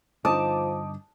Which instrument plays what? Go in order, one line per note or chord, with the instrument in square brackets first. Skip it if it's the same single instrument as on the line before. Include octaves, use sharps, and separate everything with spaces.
[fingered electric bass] G2 D3 [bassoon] F3 [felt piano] D#4 D6 D#6 [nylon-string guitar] A5